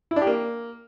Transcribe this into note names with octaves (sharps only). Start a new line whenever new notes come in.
E4
D4
G4
A#3